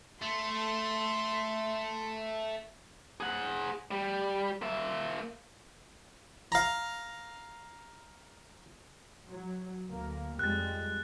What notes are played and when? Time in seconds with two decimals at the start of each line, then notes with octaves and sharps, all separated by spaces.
0.22 A3 C6
3.20 G#4 F#5
3.91 G3
4.62 A#3 E5
6.52 F5 A#5
9.29 F#3
9.89 D2 A#3
10.39 F2 G3 G#3 F#6 A6